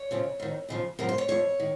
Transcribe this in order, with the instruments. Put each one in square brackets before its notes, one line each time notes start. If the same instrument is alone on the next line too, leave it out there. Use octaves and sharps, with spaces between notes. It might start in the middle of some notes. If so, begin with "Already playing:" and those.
Already playing: [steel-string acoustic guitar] C#5
F2 C#3 F3
F2 D#3
D#2 C#3 F3
F#2 C#3 F3 A#4
C5
C#5
F2 C#3 F3 C#5
D#3